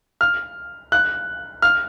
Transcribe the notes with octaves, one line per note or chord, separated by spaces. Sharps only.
F6
F#6
F6